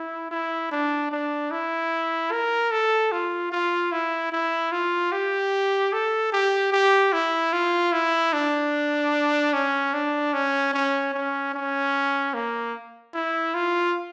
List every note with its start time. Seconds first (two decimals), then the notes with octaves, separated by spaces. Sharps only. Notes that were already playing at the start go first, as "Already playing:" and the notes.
Already playing: E4
0.31 E4
0.71 D4
1.12 D4
1.51 E4
2.32 A#4
2.71 A4
3.12 F4
3.52 F4
3.92 E4
4.32 E4
4.72 F4
5.12 G4
5.93 A4
6.32 G4
6.73 G4
7.13 E4
7.53 F4
7.93 E4
8.33 D4
9.53 C#4
9.94 D4
10.34 C#4
10.74 C#4
11.14 C#4
11.54 C#4
12.34 A#3
13.14 E4
13.54 F4